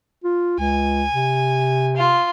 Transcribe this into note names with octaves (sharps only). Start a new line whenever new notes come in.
F4
C#2 G#5
C3
F4